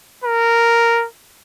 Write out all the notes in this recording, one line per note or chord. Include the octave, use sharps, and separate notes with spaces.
A#4